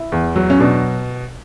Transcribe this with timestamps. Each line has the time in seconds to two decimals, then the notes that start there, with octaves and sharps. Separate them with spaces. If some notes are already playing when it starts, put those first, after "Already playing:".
Already playing: E4
0.12 E2
0.36 F#3
0.50 C#4
0.60 B2 D4